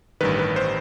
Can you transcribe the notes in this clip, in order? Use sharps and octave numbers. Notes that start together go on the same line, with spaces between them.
A1 G2 D#3 B4
B4
C5